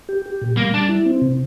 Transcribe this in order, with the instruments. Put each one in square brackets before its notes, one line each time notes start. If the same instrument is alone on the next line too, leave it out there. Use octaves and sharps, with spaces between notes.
[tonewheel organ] G4
G4
A#2
[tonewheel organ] G3 [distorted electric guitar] A#3
[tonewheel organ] G3 [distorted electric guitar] D4
[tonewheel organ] E4
C4
C3